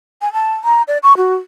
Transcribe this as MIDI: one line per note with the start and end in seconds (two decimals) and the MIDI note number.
0.22 0.32 80
0.33 0.53 81
0.64 0.82 82
0.88 0.98 74
1.03 1.16 85
1.17 1.34 66